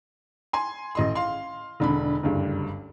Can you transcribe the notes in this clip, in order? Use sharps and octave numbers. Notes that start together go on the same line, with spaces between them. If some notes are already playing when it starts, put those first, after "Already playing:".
G#5 C6
A1 D#5 C6
F5 C6
E1 D3 B5
F#1 D2 G2